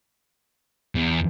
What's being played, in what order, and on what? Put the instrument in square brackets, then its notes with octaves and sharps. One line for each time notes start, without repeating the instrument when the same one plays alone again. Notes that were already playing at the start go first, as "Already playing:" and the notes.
[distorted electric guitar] E2